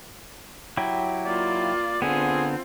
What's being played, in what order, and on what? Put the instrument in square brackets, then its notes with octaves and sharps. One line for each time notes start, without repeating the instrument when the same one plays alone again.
[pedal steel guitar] F#3 E4 G4
[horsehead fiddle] A#3 F4 [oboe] D5
[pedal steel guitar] D3 B3 [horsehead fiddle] C4 F4 [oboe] G#4